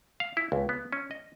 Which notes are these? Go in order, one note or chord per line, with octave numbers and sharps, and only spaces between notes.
F5
E4
C#2
B3
C#4
D#5